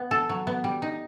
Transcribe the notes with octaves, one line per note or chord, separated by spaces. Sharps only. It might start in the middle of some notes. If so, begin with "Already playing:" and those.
Already playing: B3
A4
F#3
B3
G3
D#4